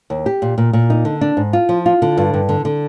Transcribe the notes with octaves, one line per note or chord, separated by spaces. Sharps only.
D#2
G4
A#2
A#2
A#2
D#4
D3
D4
G#2
F4
F3
F4
D3
G2
G2
D3
D3